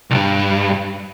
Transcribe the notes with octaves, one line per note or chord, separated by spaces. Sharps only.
C2 G2